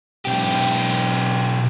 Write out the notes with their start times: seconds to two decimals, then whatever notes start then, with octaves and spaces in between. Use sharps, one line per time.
0.25 B1 G4